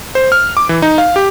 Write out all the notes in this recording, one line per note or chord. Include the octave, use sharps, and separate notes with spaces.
C5
F6
D6
E3
D#4
F5
G4